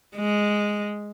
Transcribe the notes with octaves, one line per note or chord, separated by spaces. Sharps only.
G#3